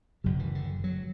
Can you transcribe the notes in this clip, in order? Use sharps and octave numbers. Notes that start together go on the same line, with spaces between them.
F#1 F#2 C#3 F#3
E3
D3
F#3